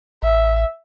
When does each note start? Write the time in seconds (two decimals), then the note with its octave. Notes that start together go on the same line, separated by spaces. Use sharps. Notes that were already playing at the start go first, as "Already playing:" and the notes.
0.23 A1 E5